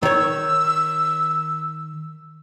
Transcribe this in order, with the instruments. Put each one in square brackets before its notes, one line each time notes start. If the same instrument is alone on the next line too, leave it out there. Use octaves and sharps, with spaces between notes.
[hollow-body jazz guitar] D#3 C#5 [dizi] E6